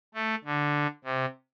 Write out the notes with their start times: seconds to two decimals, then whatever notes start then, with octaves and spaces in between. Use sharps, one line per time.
0.14 A3
0.45 D3
1.05 C3